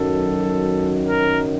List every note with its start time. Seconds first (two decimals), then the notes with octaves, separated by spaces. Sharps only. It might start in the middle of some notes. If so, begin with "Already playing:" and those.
Already playing: F#2 D#3 F#3 A4
1.08 A#4